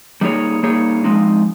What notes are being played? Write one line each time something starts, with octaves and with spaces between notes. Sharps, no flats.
G3 A#3 D#4 G#4 C#5
G3 A#3 D#4 G#4 C#5
F3 G#3 C4 D#4